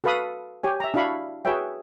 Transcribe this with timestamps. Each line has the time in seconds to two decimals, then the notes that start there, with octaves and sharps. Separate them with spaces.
0.04 F#4 A4 B4 F5 B5 D#6
0.63 G4 C#5 G#5
0.80 E5 A#5
0.94 D4 E4 F#4 F5 B5 C#6
1.45 F#4 G#4 B4 C#5 E5 G5